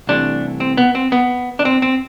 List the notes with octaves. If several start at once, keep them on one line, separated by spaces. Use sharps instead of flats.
C2 C3 E3 A3 D4
C4
B3
C4
B3
D4
C4
C4